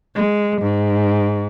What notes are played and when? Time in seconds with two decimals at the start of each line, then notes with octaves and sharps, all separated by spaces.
0.16 G#3
0.62 G#2